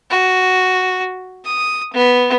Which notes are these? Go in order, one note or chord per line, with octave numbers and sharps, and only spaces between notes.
F#4
D#6
B3